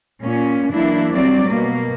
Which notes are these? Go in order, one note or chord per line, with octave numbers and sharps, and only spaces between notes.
A#2 C#4
E3 F#3 A#3 D4 E4
F#3 G3 C4 D5
B2 A#3